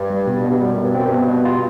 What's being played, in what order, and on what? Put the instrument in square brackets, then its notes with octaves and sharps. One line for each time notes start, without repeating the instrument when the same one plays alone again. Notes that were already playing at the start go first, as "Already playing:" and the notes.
Already playing: [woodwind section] G2
[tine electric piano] G3
B2
B2
[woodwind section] G2
[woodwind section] F#2 [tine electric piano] G3
[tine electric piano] B2
[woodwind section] G2
[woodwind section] F#2 [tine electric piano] C4
[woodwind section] G2
[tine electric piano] B2
B2
F4